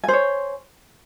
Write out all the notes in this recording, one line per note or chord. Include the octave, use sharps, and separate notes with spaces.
C5 C#5 G#5